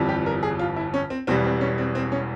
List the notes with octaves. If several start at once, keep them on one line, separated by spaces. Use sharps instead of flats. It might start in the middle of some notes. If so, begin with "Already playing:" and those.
Already playing: G1 F2 E3 G3
G4
A#4
G#4
F4
E4
C#4
C4
E1 E2 E3 G3 C4
C4
C#4
C4
C4
C#4